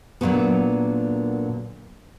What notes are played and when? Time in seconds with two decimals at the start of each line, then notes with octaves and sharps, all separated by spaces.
0.21 A#2 D3 E3 F#3 A3 B3